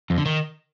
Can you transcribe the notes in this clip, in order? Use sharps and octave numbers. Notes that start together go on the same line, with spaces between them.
F2
D3
D#3